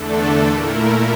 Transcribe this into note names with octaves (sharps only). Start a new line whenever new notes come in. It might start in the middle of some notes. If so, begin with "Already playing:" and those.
Already playing: E2 D3 A3 D4 A4
A#2 A3 E4 A#4